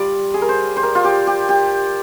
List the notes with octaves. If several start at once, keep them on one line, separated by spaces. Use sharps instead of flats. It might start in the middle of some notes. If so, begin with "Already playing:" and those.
Already playing: G3 F4 D5
G#4
A#4
C5
C5
A#4
F4
G4
G4
G4